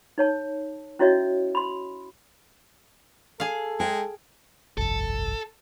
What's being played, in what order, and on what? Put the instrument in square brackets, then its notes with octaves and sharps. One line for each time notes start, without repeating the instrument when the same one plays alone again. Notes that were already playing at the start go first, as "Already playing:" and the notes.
[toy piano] D#4 C#5 A5
C#4 E4 F#4 C#5 D#5 E5
B5 C6
[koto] G#4 F5 [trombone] A4
[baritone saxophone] G#3 [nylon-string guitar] G5
[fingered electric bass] G1 C2 F2 [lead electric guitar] A4